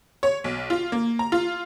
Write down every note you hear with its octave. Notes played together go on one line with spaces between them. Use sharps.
C#5
B1
F4
A#3
A#5
F4